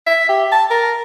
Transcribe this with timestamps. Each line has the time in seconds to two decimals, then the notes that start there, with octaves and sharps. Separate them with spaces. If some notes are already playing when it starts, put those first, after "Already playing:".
0.06 E5
0.29 G4
0.52 A5
0.70 A#4